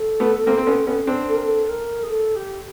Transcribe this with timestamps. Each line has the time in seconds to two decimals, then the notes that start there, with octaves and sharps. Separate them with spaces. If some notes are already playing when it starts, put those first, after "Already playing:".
Already playing: A4
0.20 A3 B3
0.47 A#3 C4
0.58 C4
0.67 B3 C#4
0.87 B3 C#4
1.07 C4 D4
1.28 A4
1.36 A#4
1.43 A4
1.69 A#4
2.03 G#4
2.09 A4
2.36 G4